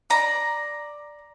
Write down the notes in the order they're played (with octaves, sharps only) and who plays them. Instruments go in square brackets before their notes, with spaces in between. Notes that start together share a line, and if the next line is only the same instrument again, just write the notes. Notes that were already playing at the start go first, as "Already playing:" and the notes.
[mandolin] D5 A#5